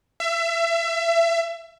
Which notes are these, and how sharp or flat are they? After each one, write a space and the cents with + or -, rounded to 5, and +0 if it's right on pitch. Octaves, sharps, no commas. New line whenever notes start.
E5 +30